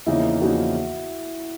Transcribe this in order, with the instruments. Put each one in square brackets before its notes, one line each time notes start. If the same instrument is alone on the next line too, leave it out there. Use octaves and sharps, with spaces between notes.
[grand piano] E2 C#3 F3 A#3 D#4 [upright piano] E4
[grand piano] E2 C#3 F3 A#3 D#4 [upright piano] F#4